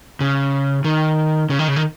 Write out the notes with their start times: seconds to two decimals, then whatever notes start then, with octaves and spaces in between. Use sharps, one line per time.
0.20 C#3
0.84 D#3
1.50 C#3
1.59 D#3
1.68 C#3
1.76 D#3